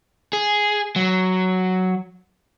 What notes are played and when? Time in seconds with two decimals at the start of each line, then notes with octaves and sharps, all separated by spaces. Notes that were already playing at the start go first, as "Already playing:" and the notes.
0.33 G#4
0.96 F#3